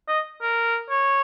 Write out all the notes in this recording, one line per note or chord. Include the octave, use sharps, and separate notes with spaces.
D#5
A#4
C#5